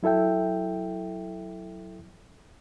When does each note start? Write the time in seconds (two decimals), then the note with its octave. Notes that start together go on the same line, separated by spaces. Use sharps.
0.03 F#3 E4 A4 E5 G5